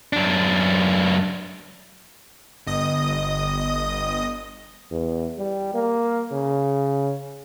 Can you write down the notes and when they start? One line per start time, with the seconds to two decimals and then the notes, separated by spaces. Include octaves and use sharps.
0.13 F#2 D4
2.66 G1 D#5 D#6
4.91 E2
5.38 G3
5.75 A#3
6.32 C#3